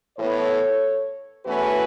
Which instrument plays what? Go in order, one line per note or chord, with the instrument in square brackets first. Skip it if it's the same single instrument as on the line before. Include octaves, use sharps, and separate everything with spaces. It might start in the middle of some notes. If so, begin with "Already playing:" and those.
[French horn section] A2 E3 B3 A4 C#5
E2 E3 A3 C#4 F#4 B4